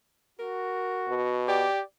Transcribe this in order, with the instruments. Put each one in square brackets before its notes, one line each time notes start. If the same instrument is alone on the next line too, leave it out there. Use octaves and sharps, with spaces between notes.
[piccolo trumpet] F#4 [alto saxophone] A#4
[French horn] B2
[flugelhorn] G4 [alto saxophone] D5